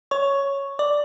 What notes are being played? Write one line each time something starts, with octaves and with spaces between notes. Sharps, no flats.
C#5 C#6
D5 D6